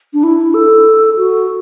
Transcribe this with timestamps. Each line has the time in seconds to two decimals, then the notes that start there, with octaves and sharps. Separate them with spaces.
0.13 D4
0.23 E4
0.54 A4
1.17 F#4